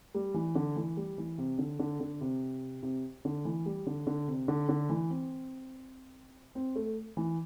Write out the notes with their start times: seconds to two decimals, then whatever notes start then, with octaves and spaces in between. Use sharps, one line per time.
0.15 G3
0.34 E3
0.55 D3
0.76 E3
0.97 G3
1.18 E3
1.38 C3
1.58 D3
1.79 D3
2.00 D3
2.21 C3
2.83 C3
3.25 D3
3.45 E3
3.66 G3
3.87 D3
4.07 D3
4.28 C3
4.48 D3
4.69 D3
4.90 E3
5.10 C4
6.55 C4
6.75 A3
7.17 E3